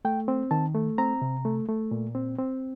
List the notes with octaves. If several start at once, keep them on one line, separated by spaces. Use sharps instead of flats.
A3 G5
C4
D#3 A5
A3
C4 A#5
C3
A3
A3
A#2
C4
C4